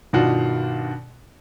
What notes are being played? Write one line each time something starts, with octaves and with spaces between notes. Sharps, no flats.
G2 B2 D#3 D4 F4 F#4